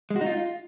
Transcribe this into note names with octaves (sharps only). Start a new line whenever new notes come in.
G#3
F#4
D#4
F4